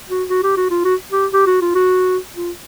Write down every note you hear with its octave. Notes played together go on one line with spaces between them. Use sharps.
F#4
F#4
G4
F#4
F4
F#4
G4
G4
F#4
F4
F#4
F4